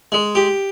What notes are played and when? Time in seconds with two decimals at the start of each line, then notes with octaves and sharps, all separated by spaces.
0.12 G#3
0.35 G4